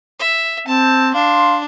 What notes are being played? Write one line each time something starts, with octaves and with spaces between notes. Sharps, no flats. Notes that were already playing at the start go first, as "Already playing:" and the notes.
E5
C4 A5
D4 F5 C6